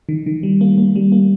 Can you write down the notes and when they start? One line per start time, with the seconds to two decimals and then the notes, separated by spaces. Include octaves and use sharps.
0.09 D#3
0.26 D#3
0.43 G3
0.61 A#3
0.78 A#3
0.96 G3
1.12 A#3